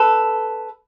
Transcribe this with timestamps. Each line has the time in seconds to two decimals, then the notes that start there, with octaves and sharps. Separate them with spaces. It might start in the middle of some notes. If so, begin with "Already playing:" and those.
Already playing: A4 B4